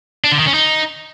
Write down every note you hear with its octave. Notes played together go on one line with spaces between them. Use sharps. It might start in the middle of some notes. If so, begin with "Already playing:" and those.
D4
D3
D#3
C#4
D#4